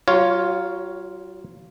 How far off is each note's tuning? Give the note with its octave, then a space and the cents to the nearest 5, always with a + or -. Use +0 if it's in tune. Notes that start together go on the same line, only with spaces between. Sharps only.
F#3 +40 F4 +0 C#5 +0